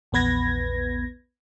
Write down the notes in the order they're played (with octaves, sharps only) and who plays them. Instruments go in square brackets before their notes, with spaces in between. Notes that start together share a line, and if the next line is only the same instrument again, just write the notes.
[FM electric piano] A#1 E2 B3 B4 G#6 A#6